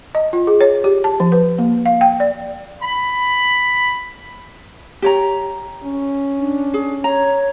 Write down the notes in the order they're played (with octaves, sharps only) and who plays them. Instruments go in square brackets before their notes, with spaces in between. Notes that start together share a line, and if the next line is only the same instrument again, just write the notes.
[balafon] D#5
F4
G#4
C#5
G4
A5
F3
B4
A#3
F5
G5
D5
[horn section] B5
[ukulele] G4 C#5 A#5
[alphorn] C#4
[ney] D4
[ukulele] G#4
[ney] C#5 [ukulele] A#5